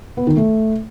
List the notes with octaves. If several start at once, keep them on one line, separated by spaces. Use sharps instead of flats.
B3
D#3
A3